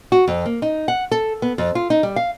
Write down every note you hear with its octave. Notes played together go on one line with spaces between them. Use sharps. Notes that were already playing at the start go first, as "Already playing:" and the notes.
F#4
F2
A#3
D#4
F#5
A4
B3
F2
F4
D#4
G3
F5